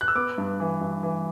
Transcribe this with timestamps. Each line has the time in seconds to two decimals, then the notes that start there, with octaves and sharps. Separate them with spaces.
0.01 F#6
0.08 E6
0.15 B3 D6
0.38 G2
0.60 E3
0.81 G2
1.03 E3